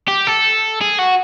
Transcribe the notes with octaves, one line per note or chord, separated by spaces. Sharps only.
G4
A4
G#4
F#4